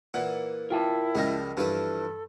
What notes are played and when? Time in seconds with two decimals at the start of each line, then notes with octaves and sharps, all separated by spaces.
0.14 A#2 E3 F#5
0.70 E4 F4 A#4 G5 A5
1.15 C#2 F3 G3 G#3 A#6
1.57 G2 E3 F3 A4 B4